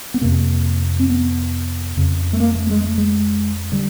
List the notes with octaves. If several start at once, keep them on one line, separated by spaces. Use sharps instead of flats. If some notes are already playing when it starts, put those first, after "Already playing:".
B3
F2 C3 A#3
C4
B3
F2 C#3
A3
A#3
A3
G#3
A3
G#3
D3 G3